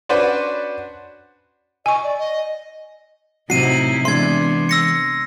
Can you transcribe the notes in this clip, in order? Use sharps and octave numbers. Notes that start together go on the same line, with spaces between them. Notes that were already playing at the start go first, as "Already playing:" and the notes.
C#4 D4 F#4 B4 C5 D5
D#5 G#5 C#6
D5
D#5
A2 C3 F#3 D#4 E4 F#4 C7 D#7
E3 G#3 B3 D4 E5 C6 G#6
E6 A#6 C#7